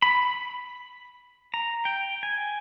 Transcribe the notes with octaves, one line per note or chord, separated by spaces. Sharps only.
B5
A#5
G5
G#5